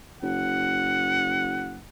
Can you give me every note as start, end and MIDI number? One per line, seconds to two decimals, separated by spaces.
0.22 1.87 30
0.22 1.81 78